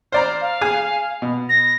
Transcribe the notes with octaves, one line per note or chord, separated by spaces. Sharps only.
C5 D5 A#5 F6
F5
G#4 G#5
B2
A#6